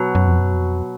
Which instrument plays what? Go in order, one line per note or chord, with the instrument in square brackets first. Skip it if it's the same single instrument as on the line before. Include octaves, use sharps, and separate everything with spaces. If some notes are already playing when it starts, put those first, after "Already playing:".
Already playing: [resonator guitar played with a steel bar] B2 F#3
[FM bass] F#2
F2
F#2
F2